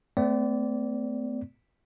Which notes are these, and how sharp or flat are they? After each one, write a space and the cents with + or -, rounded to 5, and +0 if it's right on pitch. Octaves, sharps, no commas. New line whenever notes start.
A3 +5 C4 -45 D5 -20